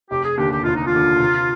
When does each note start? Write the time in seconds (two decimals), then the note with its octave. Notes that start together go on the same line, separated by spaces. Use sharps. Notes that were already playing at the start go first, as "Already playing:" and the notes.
0.10 F1 G4
0.24 G#4
0.37 D#2 D3 G4
0.52 G4
0.63 F1 F4
0.75 D#4
0.86 F4
0.93 D#2 D3
1.20 C3